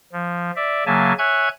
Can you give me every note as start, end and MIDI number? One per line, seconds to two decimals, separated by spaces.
0.13 0.51 53
0.56 0.84 74
0.56 0.84 76
0.86 1.13 49
0.86 1.13 54
0.86 1.13 58
0.86 1.13 76
0.86 1.13 80
0.86 1.13 81
1.18 1.49 73
1.18 1.49 76
1.18 1.49 80
1.18 1.49 90
1.18 1.49 92